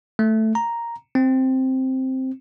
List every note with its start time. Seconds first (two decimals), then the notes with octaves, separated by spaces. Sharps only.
0.19 A3
0.55 A#5
1.15 C4